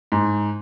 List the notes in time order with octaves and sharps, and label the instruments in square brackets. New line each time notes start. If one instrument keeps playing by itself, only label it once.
[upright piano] G#2